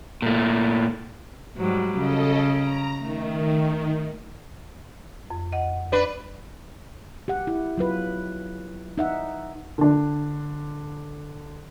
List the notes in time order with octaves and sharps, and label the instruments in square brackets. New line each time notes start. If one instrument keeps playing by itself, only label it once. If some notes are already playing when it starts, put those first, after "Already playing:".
[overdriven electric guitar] A#2 A3
[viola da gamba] G#2 F#3 G3
[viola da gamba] C#3 [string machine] A4 D#5
[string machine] A#5
[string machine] D#3 [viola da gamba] A3
[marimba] F2
D#5 F#5
[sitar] D4 B4
[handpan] G4 F#5
E4
F#3 F4 B4
D#4 E5 F#5
[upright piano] D3 D4